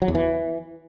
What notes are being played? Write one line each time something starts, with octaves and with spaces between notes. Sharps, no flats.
F#3
E2
E3